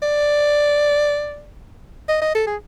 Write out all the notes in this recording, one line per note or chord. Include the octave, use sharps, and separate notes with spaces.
D5
D#5
D#5
A4
G#4